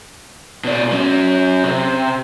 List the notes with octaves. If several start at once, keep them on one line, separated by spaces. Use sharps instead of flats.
B2 D5
F#3 C#4
C3